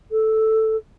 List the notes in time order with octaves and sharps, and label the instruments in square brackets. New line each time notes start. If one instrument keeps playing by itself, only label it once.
[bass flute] A4